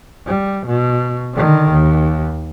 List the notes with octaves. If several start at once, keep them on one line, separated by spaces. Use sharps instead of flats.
G3
B2
D3 D#3
D#2